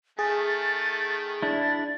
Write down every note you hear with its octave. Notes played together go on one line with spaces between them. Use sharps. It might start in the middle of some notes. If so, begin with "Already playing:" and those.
D#3 A3 G#4 A6
D4 E4 A6